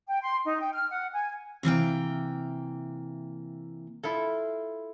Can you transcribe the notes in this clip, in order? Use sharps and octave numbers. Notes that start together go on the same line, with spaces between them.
G5
C6
D#4
G5
F6
F#5
G#5
C3 E3 A#3 G5
E4 F4 A4